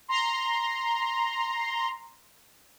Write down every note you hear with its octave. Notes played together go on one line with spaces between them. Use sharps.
A#5 C6